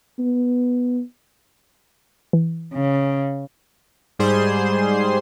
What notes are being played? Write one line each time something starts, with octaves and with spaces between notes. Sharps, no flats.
B3
E3
C#3
G#2 G3 G#4 C5 C6